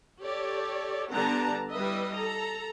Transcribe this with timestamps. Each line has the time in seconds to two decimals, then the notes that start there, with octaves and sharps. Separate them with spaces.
0.23 G4 A4 C#5 D5
1.12 D3 G3 B3 F#5 A5 A#5
1.71 G3 E4 B4 D#5 E5
2.14 A4 A#5